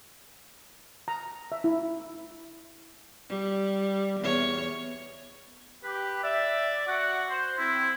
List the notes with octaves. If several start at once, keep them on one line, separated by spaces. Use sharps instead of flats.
A#5
E5
E4
G3
E2 C#5
G4 B4
D5 E5
F#4 F#5
C5
C4 E4